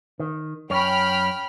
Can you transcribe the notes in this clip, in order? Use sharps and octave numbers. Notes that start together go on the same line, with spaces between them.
D#3
F#2 C#5 G5 B5 F6